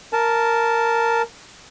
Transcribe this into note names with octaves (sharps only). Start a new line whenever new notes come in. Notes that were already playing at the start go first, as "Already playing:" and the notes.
A#4 A5